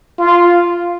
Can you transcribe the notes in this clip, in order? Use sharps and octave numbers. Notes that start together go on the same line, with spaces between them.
F4